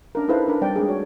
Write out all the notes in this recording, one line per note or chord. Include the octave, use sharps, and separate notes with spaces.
C#4 D4 A#4
D#4 E4 A4 B4 C5 F5
D4 A4 A#4 B5
G3 C4 D5 G5
G#3 A3 D4 G#4 D5
F#4 C#5